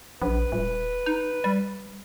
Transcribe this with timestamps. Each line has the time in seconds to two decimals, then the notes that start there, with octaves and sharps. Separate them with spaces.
0.22 A#1 B4
0.52 D#1
1.06 D#4
1.44 G3